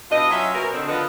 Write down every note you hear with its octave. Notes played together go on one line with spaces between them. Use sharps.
B2 D4 E4 F4 D#5
F#3 C#4 F4 E5
B2 C#4 A#4
D3 D#3 C4
D3 F3 B3 A#4 B4 D#5